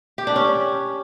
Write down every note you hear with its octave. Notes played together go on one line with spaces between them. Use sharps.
G4
D4
C#4